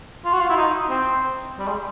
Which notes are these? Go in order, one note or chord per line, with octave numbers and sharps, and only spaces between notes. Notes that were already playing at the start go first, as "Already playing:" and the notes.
F4
F#4
F4
E4
D#4
C4
G3
G#3